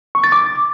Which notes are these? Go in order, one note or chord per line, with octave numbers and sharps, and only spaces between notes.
C#6
A6
D6